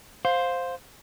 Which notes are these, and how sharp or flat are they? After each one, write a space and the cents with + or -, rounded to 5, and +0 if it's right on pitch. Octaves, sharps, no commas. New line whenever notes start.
C5 +0 F5 +15